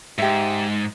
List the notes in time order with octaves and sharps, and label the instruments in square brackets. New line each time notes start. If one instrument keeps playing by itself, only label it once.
[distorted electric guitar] G#2 [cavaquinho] G4 E5